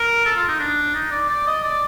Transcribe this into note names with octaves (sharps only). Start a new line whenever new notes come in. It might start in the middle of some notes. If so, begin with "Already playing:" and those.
Already playing: A#4
A4
F4
D#4
D4
D#4
D5
D5
D#5
D5